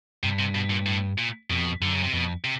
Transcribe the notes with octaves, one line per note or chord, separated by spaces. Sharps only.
G2 C3
C3
B2
A#2
A2
A#2
F2 B2
F#2 D3
C#3
C3
F2 B2
C3